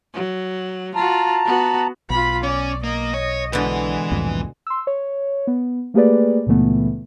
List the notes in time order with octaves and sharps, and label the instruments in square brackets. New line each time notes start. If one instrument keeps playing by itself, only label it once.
[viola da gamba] F#3
[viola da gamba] F4 F#4 [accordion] A5 A#5
[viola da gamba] B3 F#4
[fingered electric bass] B1 [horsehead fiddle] F4 B5
[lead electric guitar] C#4 [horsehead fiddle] D5
[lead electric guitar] A#3 [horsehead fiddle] D#5
[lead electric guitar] C#5
[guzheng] B2 D3 [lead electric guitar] E3 B4 [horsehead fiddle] G#3
[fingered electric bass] C2 F2 A2
[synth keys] C6 E6
C#5
B3
A3 A#3 G4 G#4 B4 D5
C#2 A#2 C#3 E3 A3 B3